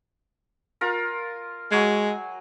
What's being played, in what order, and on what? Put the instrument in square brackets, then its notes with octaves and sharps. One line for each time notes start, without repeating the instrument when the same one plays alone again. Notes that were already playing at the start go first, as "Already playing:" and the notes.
[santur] F4 A#4
[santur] F#3 G#5 [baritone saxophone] G#3